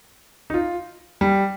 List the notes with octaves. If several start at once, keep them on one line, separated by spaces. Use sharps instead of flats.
D#4
F4
G3